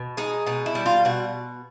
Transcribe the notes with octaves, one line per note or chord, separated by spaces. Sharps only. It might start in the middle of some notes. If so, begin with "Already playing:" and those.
Already playing: B2
G#3 D#4
B2 D#4
E4
G3
F4
B2 F#4